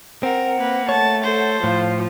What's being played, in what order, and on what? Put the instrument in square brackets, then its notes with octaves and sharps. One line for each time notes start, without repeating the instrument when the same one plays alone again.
[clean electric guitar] C4 [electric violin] A#4 [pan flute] F#5
[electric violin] A#3 B4
[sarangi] A3 [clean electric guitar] C#5 [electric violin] A5
[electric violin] A4 C5
[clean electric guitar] A2 [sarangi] F3 [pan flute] F5